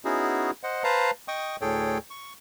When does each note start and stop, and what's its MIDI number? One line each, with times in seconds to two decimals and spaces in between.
0.05 0.51 59
0.05 0.51 61
0.05 0.51 63
0.05 0.51 64
0.05 0.51 66
0.05 0.51 68
0.63 0.83 72
0.63 0.83 75
0.63 0.83 78
0.84 1.11 71
0.84 1.11 72
0.84 1.11 77
0.84 1.11 81
0.84 1.11 82
1.28 1.56 75
1.28 1.56 79
1.28 1.56 85
1.28 1.56 87
1.61 1.98 38
1.61 1.98 45
1.61 1.98 68
1.61 1.98 69
1.61 1.98 73
1.61 1.98 79
2.10 2.33 85